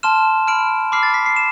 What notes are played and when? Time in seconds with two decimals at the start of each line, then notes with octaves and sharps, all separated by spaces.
0.03 A5 C6 F6 E7
0.47 B5 F6 D7
0.92 B5 D6 F6 C7
1.03 A6
1.14 B6
1.26 C7
1.36 E7